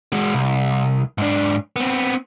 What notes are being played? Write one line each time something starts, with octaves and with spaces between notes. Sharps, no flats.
G#3 F#4
C2
G#2 D4
B3 C4